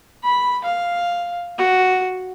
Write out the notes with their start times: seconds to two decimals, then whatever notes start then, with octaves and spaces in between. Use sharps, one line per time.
0.23 B5
0.64 F5
1.58 F#4